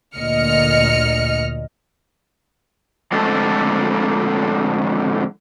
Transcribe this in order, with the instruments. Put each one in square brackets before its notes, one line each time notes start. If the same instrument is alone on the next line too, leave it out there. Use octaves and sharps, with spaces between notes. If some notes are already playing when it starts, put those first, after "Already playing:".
[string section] D2 A#2 D#5 F6 C#7
[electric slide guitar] F2 A2 D3 G#3 A4